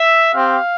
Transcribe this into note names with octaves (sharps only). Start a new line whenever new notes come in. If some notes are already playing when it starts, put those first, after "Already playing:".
Already playing: E5
C4 G4 F5